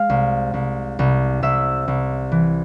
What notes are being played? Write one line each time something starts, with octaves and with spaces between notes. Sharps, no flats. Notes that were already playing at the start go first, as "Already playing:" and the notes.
Already playing: G#3 F5
C2
C2
C2
C2 E5 E6
C2
E3